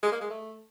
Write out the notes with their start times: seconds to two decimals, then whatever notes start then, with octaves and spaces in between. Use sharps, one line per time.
0.03 G#3
0.12 A#3
0.21 G#3
0.30 A3